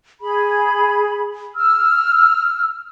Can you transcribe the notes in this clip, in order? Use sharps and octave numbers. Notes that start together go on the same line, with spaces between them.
G#4 B5
E6 F6